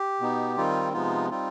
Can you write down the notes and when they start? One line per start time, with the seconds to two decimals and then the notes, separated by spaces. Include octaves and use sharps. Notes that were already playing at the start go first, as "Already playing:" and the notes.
Already playing: G4
0.20 B2 B3 D#4
0.56 D#3 G3 C4 D#4 F4
0.93 C3 F3 G#3 B3 D#4 F4
1.30 G3 C4 D#4 F4